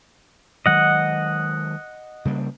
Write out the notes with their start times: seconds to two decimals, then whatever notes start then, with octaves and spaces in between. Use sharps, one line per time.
0.66 D#3 F#3 G#3 D#5 F#5
2.25 C#3 G3 A#3